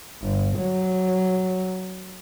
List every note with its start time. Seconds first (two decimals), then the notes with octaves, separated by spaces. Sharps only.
0.22 G1
0.58 F#3